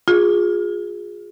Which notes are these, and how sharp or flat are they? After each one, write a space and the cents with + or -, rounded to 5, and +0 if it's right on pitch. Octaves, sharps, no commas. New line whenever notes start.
F4 +25 G#4 -5